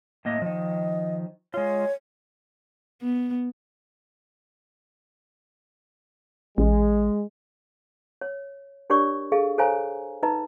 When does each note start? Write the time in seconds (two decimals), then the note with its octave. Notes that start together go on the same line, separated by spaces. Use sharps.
0.25 A2 A#3 D#5
0.42 D#3 F3 D#5
1.54 G#3 F4 C#5
3.03 B3
6.58 A1 G#3
8.21 C#5
8.90 D4 G4 A#4 C#5 D5 C#6
9.32 G#4 A4 D#5 F5
9.58 A4 C5 C#5 F5 G#5 A#5
10.23 D#4 B4 D#5 A#5